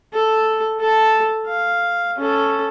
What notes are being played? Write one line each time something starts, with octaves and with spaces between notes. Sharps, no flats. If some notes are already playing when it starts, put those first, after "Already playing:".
A4
A4 A5
F5
C#4 A4